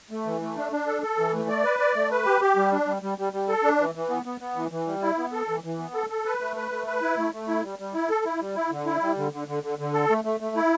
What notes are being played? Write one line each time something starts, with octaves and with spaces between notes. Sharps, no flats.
A3
E3
A3
D4
D4
A4
A4
E3
A3
D5
B4
D5
A3
B4
G4
G4
G3
D4
G3
G3
G3
G3
A4
D4
E3
E3
B3
B3
B3
E3
E3
G3
E4
B3
A4
E3
E3
B3
A4
A4
B4
A3
B4
A3
B4
E4
A3
A3
E4
G3
G3
E4
A4
E4
G3
E4
D3
E4
G3
D3
D3
D3
D3
D3
A4
A3
A3
A3
E4